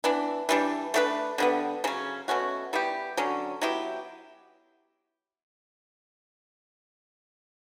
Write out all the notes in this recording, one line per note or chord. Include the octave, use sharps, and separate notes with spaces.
E3 B3 D4
E3 G3 D4
A3 D4 G4 B4
D3 G3 B3
C#3 F#3 C#4
B2 A3 C#4 F#4
G3 B3 E4 G4
D3 F#3 C#4
F#3 B3 E4 G4